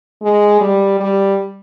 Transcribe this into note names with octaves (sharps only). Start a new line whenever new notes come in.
G#3
G3
G3